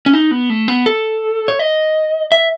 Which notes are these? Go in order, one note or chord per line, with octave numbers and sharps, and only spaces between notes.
C#4
D#4
B3
A3
B3
A4
C#5
D#5
E5